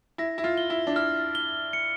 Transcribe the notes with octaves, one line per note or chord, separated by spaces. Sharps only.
E4 A#6
E4
F4
G7
E4
D4
E4 F6
G7
C#7